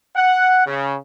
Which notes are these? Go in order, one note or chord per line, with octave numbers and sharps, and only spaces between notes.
F#5
C#3